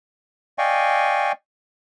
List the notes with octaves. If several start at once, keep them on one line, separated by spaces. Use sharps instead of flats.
D5 D#5 F5 G5 G#5 C#6